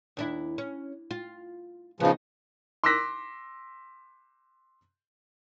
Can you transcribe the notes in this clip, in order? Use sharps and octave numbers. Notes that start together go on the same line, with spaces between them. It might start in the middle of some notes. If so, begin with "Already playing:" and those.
D#2 D4 E4
C#4
F4
C#3 F3 B3 D#4
C6 D6 E6 F#6 A#6 B6